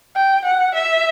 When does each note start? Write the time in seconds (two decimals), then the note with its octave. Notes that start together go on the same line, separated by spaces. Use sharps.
0.16 G5
0.45 F#5
0.75 E5